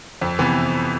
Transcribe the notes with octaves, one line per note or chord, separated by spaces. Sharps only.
F2
C3 E3 B3